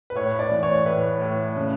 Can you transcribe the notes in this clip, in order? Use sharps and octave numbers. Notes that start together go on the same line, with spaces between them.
B4
A2 C#5
D5
E3
C#5
A2 B4
A2
C#3